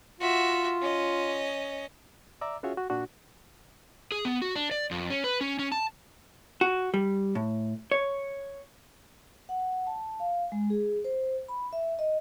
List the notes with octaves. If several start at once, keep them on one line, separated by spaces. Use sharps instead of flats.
F4 F#4 E5
C#4 D#5
D5 E5 A#5 D6 E6
C#4 F4 F#4 G#4 C#5 E5
F#4
A#2 D4 F#4
G#4
B3
F#4
D4
D5
F2
C#4
B4
C#4
C#4
A5
F#4
G3
A2
C#5
F#5
A5
F5
G#3
G#4
C5
B5
E5
D#5